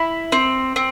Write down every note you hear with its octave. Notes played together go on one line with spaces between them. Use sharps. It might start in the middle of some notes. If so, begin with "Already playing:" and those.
Already playing: E4
C4
C4